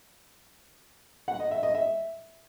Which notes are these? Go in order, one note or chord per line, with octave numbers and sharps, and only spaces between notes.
F#5
D#5
E5
D#5
E5